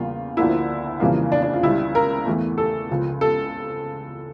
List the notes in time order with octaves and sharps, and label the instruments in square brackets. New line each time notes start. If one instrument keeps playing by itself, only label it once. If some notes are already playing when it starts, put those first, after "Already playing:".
Already playing: [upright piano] E2 C#3 G3 A#3 F4
D2 D3 F3 A#3 E4
F2 C#3 E3 G3 A#3
D4
D4
F4
C#2 C#3 G3 E4
A#4
E2 E3 A3
A4
C#2 C#3 F3
A4